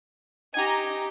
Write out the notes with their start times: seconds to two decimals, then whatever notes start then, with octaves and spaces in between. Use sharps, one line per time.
0.54 D#4 G4 G#5 A#5